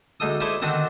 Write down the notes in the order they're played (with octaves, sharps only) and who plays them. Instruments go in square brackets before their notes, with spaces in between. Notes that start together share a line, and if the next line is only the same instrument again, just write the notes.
[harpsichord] D2 G#3 D#4 A4 D#6
D#4 E4 G#4 A4 C5 D5
D3 D#3 C4 F#4 A5